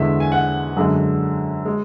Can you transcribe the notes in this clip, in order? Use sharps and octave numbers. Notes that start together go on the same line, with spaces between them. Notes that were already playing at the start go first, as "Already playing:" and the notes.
Already playing: E2 D3 G#3 E5
G#5
F#5
F#2 D3 G#3
G#3